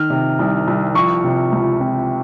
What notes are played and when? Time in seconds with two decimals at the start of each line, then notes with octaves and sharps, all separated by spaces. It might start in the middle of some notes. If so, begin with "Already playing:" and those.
Already playing: D#3 F6
0.10 C3
0.39 C2
0.67 C2
0.95 F3 C#6
1.24 C3
1.52 C#2
1.80 C4